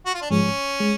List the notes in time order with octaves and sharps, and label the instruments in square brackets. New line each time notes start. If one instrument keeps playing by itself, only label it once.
[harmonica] F#4
F4
D4
[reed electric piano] G#2 F3 G#3 [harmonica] C#4
[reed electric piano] G#3